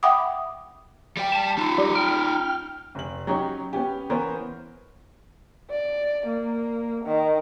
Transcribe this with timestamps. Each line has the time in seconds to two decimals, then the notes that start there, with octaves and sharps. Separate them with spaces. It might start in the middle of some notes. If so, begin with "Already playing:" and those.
0.03 E5 F#5 G5 B5 D6 D#6
1.17 G3 G5
1.32 A5
1.58 D#4 F4
1.78 G3 G4
1.95 G5 F6
2.95 F1 F#7
3.27 F#3 C#4 D#4 G4 C#5
3.73 B3 C#4 G4
4.10 E3 B3 A#4 C5 C#5
5.70 D5
6.26 A#3
7.05 D#3